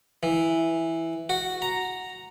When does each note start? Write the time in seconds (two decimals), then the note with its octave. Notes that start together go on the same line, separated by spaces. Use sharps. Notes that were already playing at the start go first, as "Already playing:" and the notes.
0.23 E3
1.29 F#4
1.62 A#5